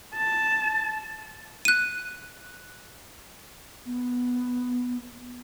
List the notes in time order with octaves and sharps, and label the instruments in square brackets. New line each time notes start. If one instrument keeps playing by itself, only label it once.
[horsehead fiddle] A5
[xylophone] F#6 D#7
[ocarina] B3